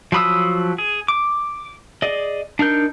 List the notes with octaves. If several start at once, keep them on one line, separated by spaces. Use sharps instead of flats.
F3 F#3 B5 D#6 E6
G#4
D6
G#4 D5 D#5
D4 D#4 A#4 G6